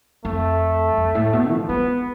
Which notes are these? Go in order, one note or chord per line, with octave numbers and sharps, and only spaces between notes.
F2 A3
F2
A2
B2
F3
G#3 B3